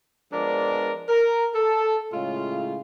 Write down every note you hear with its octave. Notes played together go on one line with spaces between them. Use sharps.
F3 G#3 B3 D4 A#4 D5
A#4
A4
A2 C#3 G#3 F4